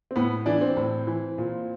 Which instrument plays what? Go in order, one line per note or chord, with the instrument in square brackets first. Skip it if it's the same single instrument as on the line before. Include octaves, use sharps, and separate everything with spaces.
[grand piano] C4
A2 B3
E3 D4
C4
A2
E3
A#2